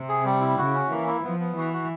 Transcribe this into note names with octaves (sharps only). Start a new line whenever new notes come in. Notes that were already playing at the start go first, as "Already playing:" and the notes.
Already playing: C3
G#4
G3
E4
C#3 F#4
C#4
E3 A#3
E4
F3 B3
B3
E3 F#4
F#4